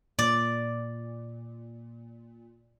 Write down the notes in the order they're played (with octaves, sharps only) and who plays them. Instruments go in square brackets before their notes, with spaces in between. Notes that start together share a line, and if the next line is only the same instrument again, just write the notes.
[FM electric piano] A#2 [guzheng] D5